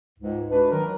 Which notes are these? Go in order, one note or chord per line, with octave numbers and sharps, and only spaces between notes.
C#2 G#2
G#3 D4 F#4 B4
D#3 F#3 A#4